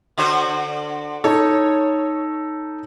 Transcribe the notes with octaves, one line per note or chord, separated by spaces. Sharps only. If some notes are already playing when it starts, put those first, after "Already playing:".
D3 F#4 C5
D#4 A4 C#5